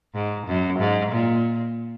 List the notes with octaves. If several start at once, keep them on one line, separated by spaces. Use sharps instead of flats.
G#2
F#2
G#2
A#2